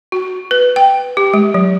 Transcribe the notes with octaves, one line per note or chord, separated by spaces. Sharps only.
F#4
B4
G5
G4
G#3
F#3